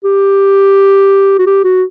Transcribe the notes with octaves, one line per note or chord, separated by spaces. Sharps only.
G4
F#4
G4
F#4